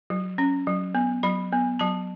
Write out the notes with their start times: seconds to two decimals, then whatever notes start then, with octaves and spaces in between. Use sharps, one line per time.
0.10 F#3
0.38 C#4
0.67 F#3
0.95 B3
1.23 F#3 B5
1.52 B3
1.79 F#3 A5